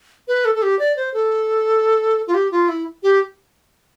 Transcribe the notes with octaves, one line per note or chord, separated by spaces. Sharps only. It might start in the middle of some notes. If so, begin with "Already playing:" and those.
B4
A4
A4
G4
D5
C5
A4
F4
G4
F4
E4
G4